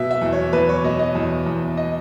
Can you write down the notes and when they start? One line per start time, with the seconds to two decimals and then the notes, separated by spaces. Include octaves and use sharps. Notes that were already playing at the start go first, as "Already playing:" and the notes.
Already playing: B2 E5
0.11 E5
0.21 E2
0.33 C#5
0.53 E2 B4
0.69 C#5
0.84 B2 D#5
0.99 D#5
1.15 E2
1.46 E2
1.77 D#5